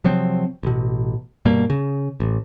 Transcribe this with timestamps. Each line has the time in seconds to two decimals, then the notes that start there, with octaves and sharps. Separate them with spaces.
0.04 C3 F3 F#3 C4
0.63 A1 B2
1.45 G2 B2 G3 A#3
1.70 C#3
2.20 A1